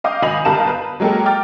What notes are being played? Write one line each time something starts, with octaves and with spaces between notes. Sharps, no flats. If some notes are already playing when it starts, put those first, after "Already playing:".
D#5 F5 D6 D#6 G6
G#1 D#5 G#5 B5 F7 F#7
G1 G3 A#4 F5 A5 E7
B4
F#3 G#3 A#3 G4 A4
G5 D6 F6 A6